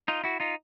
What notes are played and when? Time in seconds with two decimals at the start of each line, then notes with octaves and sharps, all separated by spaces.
0.08 D#4 F4
0.24 E4 F#4
0.40 D#4 F4